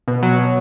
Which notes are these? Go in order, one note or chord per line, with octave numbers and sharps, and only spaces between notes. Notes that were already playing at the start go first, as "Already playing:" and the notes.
B2
F#3
B2